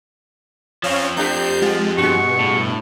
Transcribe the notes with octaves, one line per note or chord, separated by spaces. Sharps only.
F3 C4 C#4 C#5 F5
A3 D4 G4 G6 C7
G#3 F4 G4
G2 B2 G#3 F#4 C#6
A2